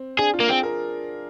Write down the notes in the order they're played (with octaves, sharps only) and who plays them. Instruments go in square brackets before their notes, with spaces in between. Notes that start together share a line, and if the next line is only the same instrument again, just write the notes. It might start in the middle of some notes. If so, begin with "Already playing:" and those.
Already playing: [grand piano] C4
[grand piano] D4 [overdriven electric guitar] G#4
[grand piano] F4
[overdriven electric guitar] A#3
[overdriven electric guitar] C4 [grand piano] G#4
[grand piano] A#4